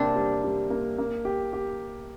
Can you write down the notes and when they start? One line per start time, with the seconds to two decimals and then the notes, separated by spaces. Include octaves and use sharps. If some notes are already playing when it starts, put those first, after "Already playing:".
Already playing: C3 G3 A#3 C4 D4
0.16 G3
0.44 G3
0.70 A#3
0.98 A#3
1.25 G4
1.53 G4